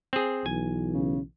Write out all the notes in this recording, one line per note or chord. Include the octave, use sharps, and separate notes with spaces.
C4 G#4
B1 E3 G#5
C#3